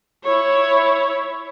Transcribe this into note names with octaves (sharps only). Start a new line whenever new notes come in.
E4 C#5